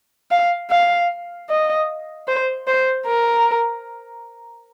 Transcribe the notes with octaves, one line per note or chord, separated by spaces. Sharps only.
F5
F5
D#5
C5
C5
A#4